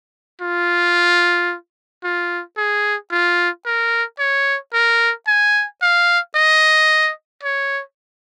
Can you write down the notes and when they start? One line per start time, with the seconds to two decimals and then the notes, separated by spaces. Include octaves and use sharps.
0.41 F4
2.04 F4
2.57 G#4
3.11 F4
3.66 A#4
4.19 C#5
4.74 A#4
5.27 G#5
5.82 F5
6.35 D#5
7.43 C#5